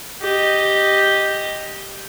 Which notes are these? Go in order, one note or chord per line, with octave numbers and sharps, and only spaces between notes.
G4 D#5